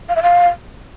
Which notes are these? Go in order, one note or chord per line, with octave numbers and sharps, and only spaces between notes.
F5
E5
F5